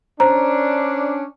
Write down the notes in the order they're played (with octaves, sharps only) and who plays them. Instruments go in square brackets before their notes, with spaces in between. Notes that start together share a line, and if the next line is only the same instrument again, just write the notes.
[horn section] C#4 D4 [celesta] C5 A#5